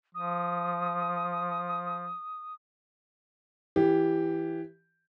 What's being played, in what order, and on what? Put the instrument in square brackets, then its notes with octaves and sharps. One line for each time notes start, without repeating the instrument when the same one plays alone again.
[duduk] F3 [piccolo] D#6
[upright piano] E3 G4